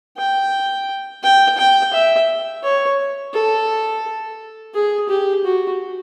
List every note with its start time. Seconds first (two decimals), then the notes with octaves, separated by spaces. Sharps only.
0.17 G5
1.23 G5
1.58 G5
1.93 E5
2.63 C#5
3.33 A4
4.74 G#4
5.09 G4
5.44 F#4